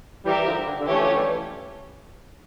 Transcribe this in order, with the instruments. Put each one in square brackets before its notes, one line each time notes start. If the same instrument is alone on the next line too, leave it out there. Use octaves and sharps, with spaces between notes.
[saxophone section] E3 G3 [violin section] G4 A#4 E5
[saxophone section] D3 F3
D3
D3
[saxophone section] E3 [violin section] A3 C#4 G4 C#5
[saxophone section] D3 F3
E3 G3